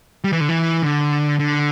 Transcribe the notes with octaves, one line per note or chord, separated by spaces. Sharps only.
G3
E3
D3
E3
D3
D3